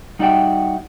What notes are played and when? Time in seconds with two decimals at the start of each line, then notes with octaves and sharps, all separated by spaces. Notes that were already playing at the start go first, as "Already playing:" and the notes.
0.19 G3 D#4 F#4 D5 E5 G5